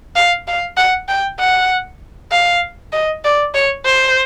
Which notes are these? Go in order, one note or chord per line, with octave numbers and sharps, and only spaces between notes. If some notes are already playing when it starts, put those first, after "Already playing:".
F5
F5
F#5
G5
F#5
F5
D#5
D5
C#5
C5